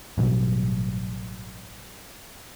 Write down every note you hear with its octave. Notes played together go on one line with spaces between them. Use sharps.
A1 G2 B2 F#3